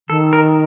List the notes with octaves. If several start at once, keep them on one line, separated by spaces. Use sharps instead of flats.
D#3 A4
A#4